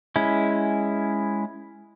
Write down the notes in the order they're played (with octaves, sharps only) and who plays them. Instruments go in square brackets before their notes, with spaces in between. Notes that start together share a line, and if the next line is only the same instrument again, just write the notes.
[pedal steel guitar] G#3 C#4 E4